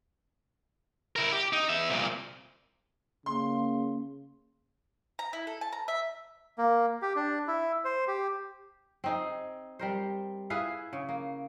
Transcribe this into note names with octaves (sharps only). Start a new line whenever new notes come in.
E4 A#4
G4
D#4
B3 E5
C2 A#2
C#3 A#3 C6
A#5
E4
A4
A5
A#5
E5
A#3
G4
D4
E4
C5
G4
C4 D#4 G#4
G3 A#4 C5
E4 G#4 B4 F5
C#3
A#3